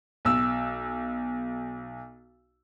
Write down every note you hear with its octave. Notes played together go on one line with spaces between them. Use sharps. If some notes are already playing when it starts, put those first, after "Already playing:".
B1 E6